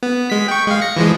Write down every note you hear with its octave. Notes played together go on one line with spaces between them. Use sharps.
B3
G#3 B6
G5 C#6
G#3 F5
A#6 C#7
E3 F3 G#3